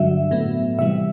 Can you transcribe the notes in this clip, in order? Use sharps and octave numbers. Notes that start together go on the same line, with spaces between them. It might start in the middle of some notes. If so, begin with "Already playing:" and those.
Already playing: G2 D3 F#3 E5
A2 F#3 B3
C3 E3 G3 E5